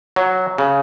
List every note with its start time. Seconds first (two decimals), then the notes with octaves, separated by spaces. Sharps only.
0.16 F#3
0.58 C#3